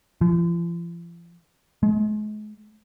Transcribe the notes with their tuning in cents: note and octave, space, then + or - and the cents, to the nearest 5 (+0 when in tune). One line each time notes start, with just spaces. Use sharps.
F3 -40
G#3 +40